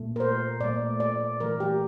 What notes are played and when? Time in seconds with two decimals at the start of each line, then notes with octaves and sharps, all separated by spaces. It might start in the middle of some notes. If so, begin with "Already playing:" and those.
Already playing: A#2 A3
0.16 A#4
0.20 C5
0.60 A#2 A3 D5
1.00 D5
1.40 E3 A3 A#4
1.60 G4